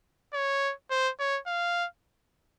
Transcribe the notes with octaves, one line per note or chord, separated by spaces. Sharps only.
C#5
C5
C#5
F5